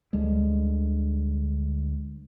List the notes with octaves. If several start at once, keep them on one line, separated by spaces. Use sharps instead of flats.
D2 D3 G3 G#3